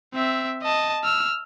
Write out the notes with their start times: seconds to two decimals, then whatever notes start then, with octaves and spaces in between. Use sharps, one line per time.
0.14 C4 E5
0.62 D#5 A5
1.04 E6 F6